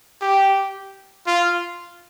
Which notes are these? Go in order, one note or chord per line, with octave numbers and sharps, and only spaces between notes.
G4
F4